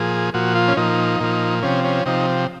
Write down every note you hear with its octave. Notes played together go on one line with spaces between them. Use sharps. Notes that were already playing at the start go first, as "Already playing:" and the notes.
Already playing: A#2 F3 G#4
A#2 F3 F#4
F4
C#4
A#2 F3 D#4
A#2 F3
C3 F3 C#4
C#4
C3 F3 D#4